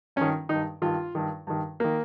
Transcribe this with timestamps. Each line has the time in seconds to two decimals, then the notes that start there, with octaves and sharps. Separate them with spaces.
0.16 G2 D#3 C#4
0.49 G2 D#3 D#4
0.82 G2 D#3 F4
1.15 G2 D#3
1.47 G2 D#3
1.80 D#3 A#3